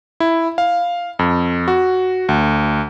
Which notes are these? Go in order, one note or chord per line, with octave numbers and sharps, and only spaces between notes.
E4
F5
F2
F#4
D2